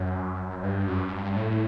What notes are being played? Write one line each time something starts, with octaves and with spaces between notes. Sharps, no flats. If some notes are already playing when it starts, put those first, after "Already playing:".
Already playing: F#2
G2
F#2
G2
A2